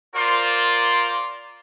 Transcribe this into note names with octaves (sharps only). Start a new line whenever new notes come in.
F4 A#4 C5 D5 C6